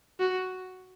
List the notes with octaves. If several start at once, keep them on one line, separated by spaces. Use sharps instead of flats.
F#4